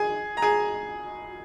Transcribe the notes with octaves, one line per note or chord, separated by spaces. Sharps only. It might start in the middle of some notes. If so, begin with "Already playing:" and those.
Already playing: G#4 G#5
A#5
G#4 G#5